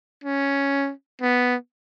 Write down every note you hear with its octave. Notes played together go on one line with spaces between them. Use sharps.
C#4
B3